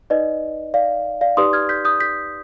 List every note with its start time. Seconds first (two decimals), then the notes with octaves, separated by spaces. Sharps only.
0.10 D#4 B4 D5 D#5
0.74 D5 F5
1.21 D5 F5
1.37 D#4 G4 B4 D5 C6 D#6
1.53 F6 G#6
1.69 G6 B6
1.85 D#6 G6
2.00 G6 B6